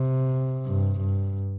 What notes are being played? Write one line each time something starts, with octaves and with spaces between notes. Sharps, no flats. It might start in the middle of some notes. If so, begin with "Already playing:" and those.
Already playing: C3
G2
G2